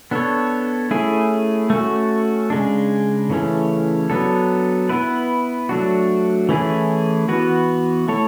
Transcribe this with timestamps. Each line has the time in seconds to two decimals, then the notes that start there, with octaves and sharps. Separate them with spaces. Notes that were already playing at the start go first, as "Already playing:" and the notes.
0.11 B3 D4 A4 C#5
0.91 A3 C#4 E4 G#4
1.70 A3 C#4 F#4
2.50 C#3 G#3 D4
3.30 C#3 E3 A3 C#4
4.10 F#3 B3 D4 A4
4.89 B3 E4 B4
5.69 F#3 A3 D4 F#4
6.49 E3 A3 C#4 E4 G#4
7.28 E3 B3 F#4 B4
8.08 A3 E4 A4 C#5